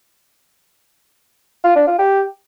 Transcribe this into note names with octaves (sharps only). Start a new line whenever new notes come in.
F4
D4
F4
G4